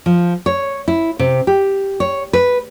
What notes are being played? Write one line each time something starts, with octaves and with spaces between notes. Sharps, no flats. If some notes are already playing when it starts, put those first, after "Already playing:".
F3
C#5
E4
C3
G4
C#5
B4